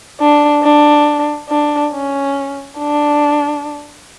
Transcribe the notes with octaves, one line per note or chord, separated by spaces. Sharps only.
D4
D4
D4
C#4
D4